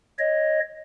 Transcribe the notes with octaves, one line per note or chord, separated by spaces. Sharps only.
C#5 D#5